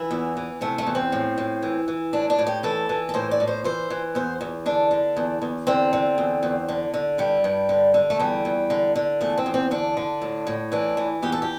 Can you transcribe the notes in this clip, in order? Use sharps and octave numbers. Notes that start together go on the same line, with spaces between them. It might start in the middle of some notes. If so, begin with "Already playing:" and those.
Already playing: E3 E4
E2
E3
C3 A3
A3
E2
C4
A2
A2
E3
E3
A2 D4
D4
A2
G4
E3 A4
E3
A4
A2 C5
D5
A2
C5
E3 C5
E3
E2 C5
E2
D3 D4
D3
E2
E2
D3 C4
D3
E2
E2
D3
D3
G2 G3
G2
D3
D3
A3
E2 G3
E2
D3
D3
E2 A3
C4
E2
C4
D3 D4
D3
A2
A2
E3 D4
E3
E2 G4
A4
G4